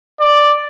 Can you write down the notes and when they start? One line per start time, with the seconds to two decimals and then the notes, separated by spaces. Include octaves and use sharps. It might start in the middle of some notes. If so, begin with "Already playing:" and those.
0.20 D5